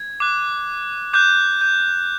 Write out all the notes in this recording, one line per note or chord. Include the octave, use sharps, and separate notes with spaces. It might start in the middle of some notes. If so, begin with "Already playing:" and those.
Already playing: G#6
D6 F#6
D6 F#6 G6
G6